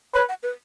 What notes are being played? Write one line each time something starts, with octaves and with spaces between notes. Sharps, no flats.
B4 C#5
F#5
B4